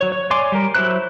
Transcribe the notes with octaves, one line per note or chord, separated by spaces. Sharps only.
F#3 C#5
C#5
C#5 D5 G#5 C6 D6
G3 A#4
F#3 E4 C5 F#6